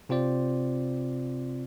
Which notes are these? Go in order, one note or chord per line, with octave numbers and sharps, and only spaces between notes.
C3 C4 F4 C5 D5